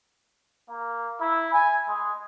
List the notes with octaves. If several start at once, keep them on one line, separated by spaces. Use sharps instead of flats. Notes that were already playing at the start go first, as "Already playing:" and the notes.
A#3
E4
G#5
G#3